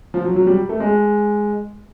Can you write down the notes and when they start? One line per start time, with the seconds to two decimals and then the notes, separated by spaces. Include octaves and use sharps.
0.14 F3
0.25 F#3
0.36 F#3
0.47 G3
0.69 A3
0.80 G#3